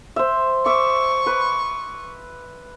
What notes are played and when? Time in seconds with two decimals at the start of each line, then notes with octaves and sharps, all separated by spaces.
0.16 C5 E5
0.66 E5 C#6 D6
1.26 B4